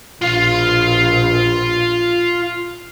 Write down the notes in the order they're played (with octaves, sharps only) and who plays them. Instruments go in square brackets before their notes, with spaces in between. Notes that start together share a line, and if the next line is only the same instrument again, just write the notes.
[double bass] A#1 B2 [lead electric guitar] F4 F5